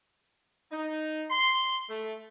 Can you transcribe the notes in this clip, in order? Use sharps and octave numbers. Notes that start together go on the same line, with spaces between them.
D#4
C6
A3